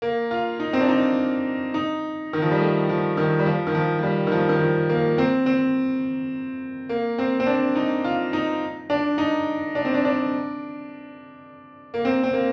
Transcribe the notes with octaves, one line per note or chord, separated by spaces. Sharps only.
A#3
F4
D#4
C4
D4
D#4
D#4
D#3
F3
G3
A3
F3
D#3
G3
F3
D#3
F3
F3
G3
D#3
F3
D#3
F3
A#3
C4
C4
A#3
C4
C4
D4
D#4
F4
D#4
D4
D#4
D4
C4
D4
D4
A#3
C4
C4
A#3